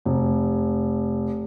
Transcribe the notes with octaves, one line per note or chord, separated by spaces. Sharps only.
F1